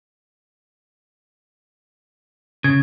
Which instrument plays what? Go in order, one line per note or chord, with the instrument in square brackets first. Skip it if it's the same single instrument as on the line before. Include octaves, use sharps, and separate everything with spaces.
[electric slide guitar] C#3 [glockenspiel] G#6